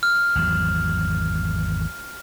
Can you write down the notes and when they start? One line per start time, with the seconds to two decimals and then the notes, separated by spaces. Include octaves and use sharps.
0.03 F6
0.35 G#1 E2 F#3